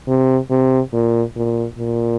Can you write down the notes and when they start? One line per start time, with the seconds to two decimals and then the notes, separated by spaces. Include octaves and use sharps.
0.08 C3
0.50 C3
0.93 A#2
1.36 A#2
1.78 A#2